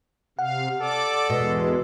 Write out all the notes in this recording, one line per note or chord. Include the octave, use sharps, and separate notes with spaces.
C3 F5 F#5
A4 D5 D6
E2 B2 G#3